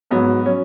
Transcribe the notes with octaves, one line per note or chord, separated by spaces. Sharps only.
G#2 F#3 B3
F#3 C#4